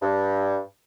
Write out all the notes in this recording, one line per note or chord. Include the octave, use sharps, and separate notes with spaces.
G2